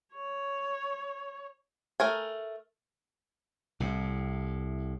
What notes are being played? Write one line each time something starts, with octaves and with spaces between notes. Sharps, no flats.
C#5
A3 A#4 G#5
C2 A2